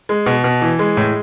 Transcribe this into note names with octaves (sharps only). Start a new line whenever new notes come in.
G#3
B2
B2
E3
G#3
A2